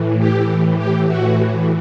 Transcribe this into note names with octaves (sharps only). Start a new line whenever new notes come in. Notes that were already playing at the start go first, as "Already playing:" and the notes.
Already playing: A2 E3
G4
A2 E3
G4
A2 E3 F#4